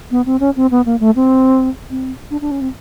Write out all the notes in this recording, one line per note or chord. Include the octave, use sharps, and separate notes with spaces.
B3
C4
C#4
C4
B3
A#3
A3
C4
C4
D4
D4
C#4
C4